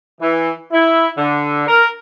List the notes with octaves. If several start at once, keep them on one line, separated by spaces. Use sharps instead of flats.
E3
E4
D3
A#4